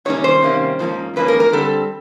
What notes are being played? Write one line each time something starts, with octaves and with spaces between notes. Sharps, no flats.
C3 D#3 G3 A#3 C#4 C#5
C5
C3 D#3 G3 A#3 C#4
G#2 F3 A#3 C#4
G#2 F3 A#3 C#4 B4
A#4
A#4
D3 G3 C4 A4